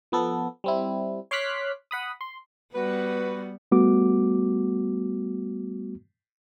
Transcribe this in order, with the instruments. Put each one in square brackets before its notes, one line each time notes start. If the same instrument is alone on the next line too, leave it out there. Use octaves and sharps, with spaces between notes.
[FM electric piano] F3 B3 A4
G3 C4 E4
C#5 C6 D6 F6 F#6 B6
F#5 B5 D#6
C6
[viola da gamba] G3 B3 [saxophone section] F#4 B4
[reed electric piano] G3 A3 B3 F#4 D6